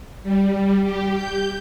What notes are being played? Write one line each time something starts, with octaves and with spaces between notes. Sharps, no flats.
G3
G4
G6